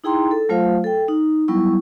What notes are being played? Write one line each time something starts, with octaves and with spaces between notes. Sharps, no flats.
D#4 E4 G#4 G5 A#5 C6
A4
F#3 A3 F4 C5 F5
A4 G5
D#4
F#3 G3 B3 E4 C#6